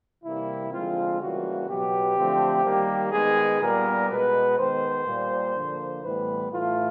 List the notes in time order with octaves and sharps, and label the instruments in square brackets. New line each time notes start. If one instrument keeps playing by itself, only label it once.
[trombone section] C3 E3 G3 A#3 E4
D3 F3 G#3 C4 F4
C#3 E3 G3 A#3 F#4
B2 F#3 B3 G4
D3 F3 A3 C4
D#3 G3 A#3
D#3 G#3 B3 G#4
A#2 G3 B3 A#4
B2 G#3 B3 B4
D#3 G#3 B3 C5
A#2 G3 A#3
D3 F3 A#3
A2 E3 G3 B3 B4
A2 E3 A3 F4